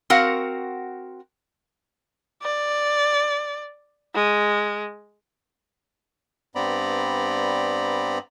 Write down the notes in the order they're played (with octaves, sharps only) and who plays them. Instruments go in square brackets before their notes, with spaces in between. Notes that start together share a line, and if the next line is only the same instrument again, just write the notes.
[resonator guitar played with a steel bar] C4 F#4 A#4 F5 F#5
[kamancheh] D5
G#3
[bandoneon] G2 B3 C4 D5 A#5 B5